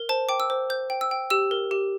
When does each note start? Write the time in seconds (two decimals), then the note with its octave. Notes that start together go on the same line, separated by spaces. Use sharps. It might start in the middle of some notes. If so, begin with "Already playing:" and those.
Already playing: A#4
0.09 C5 A5
0.29 G5 D6
0.40 E6
0.50 C5
0.70 C5 G6
0.90 G5
1.01 E6
1.11 G5
1.30 G4 E6
1.51 A#4
1.71 G4